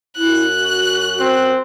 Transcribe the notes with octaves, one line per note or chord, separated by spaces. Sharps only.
F#2 E4 F#6
F#4
C4